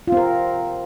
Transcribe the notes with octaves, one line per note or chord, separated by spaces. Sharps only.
C4 F4 A#4